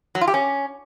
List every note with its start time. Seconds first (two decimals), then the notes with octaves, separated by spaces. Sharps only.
0.15 F#3
0.21 F4
0.28 G4
0.34 C#4